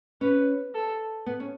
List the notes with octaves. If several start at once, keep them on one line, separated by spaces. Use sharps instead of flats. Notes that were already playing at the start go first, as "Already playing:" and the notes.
C#4 B4
A4
B3
C#4